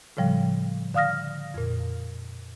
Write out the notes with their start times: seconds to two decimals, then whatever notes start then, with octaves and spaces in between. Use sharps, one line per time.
0.17 A2 C#3 F3 G3
0.94 D3 F5 D#6 F6 A#6
1.54 F2 A#2